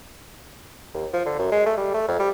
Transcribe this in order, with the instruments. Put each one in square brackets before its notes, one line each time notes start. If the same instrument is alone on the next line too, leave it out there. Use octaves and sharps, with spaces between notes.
[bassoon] D#2
F3
D3
F#2
G#3
A3
G3
A3
F2
G3